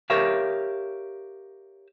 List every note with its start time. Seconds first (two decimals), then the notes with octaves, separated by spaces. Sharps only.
0.10 G4 A#4 C#5 E5 F5